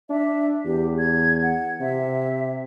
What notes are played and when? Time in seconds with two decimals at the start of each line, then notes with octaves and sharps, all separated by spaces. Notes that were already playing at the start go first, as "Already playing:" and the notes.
0.10 D4 E5
0.65 E2 G4
0.99 G#6
1.43 F#5
1.81 C3 E5